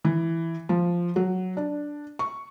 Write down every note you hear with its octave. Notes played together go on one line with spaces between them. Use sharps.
E3
F3
F#3
D4
C#6